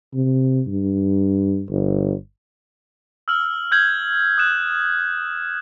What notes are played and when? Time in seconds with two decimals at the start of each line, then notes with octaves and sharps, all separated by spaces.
0.14 C3
0.67 G2
1.70 G1
3.28 E6 F6 F#7
3.71 E6 F6 G6 G#6 F#7
4.38 D#6 F#6 E7